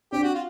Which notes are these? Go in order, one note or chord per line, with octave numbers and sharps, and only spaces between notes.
C4 D4 G4
F#4
F4